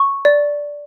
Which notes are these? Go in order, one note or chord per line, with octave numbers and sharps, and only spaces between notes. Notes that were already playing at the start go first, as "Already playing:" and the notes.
Already playing: C#6
D5